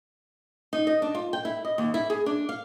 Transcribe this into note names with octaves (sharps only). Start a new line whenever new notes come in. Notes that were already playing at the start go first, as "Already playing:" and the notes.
D#4
D#5
D4
F4
G5
E4
D#5
D#2
E4
G#4
D4
F5